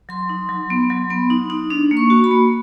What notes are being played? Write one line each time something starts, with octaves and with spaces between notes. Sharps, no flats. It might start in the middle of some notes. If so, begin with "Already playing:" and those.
F#3 C6
D#4
F#3
B3
F#3
B3
D#4
D#4
D4
A#3
C#6
F#4
B5
A#3